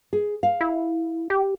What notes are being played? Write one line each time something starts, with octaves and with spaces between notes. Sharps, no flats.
G#4
F5
E4
G4